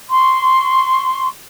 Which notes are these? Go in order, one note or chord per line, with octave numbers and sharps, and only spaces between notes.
C6 C#6